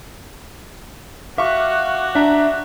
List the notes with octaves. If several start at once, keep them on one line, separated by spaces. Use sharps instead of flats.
F#4 E5 F5 C#6 D6 F#6
D4 E5 A#5